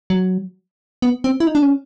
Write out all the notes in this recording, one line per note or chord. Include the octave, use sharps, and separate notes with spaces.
F#3
B3
C4
E4
D#4
D4
C#4